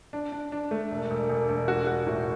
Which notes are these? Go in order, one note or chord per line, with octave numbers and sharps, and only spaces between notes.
D4
D4
D4
A3
E1
E1
E1
E1
F#4
F#4
A2